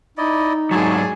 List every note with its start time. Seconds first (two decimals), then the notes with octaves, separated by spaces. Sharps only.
0.18 D#4 E4 D5 D#5
0.71 G#2 F#3 G#4 C#5 D5 A5